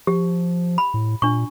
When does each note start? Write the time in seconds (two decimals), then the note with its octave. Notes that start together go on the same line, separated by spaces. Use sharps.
0.07 F3 G4
0.78 B5
0.94 A2
1.22 A#2 D4 C#6